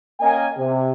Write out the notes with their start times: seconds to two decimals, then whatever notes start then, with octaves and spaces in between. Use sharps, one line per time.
0.21 A#3 C#4 A#4 D#5 G5 G#5
0.57 C3